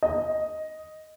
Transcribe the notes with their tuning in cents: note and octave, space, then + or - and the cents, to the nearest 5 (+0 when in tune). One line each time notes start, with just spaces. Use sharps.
D#5 +5